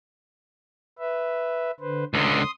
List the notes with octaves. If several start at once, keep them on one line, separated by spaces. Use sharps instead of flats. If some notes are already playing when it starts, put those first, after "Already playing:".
B4 E5
D3 B4 C5
C#2 D3 C6 D#6